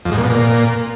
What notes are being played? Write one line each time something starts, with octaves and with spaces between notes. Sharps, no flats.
F2
G#2
A#2
B2
A#2